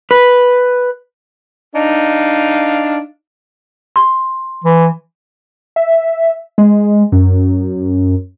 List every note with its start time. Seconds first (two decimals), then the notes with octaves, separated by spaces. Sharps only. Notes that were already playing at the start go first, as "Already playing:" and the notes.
0.11 B4
1.75 D4 D#4 F5
3.96 C6
4.64 E3
5.76 E5
6.58 G#3
7.12 F#2